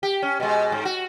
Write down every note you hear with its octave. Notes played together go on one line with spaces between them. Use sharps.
G4
C#4
B2 G#3
G#2
F#4